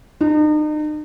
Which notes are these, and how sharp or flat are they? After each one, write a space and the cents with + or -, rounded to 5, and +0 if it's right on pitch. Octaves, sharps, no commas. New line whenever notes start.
D#4 -40